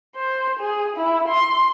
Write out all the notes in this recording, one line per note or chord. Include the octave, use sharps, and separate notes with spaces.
C5
G#4
E4
C6